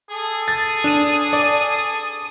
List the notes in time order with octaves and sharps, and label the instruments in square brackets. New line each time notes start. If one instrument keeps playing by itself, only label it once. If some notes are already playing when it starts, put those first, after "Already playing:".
[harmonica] G#4 A4
[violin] D#6 [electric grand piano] A6
[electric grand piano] D4 D#7
D5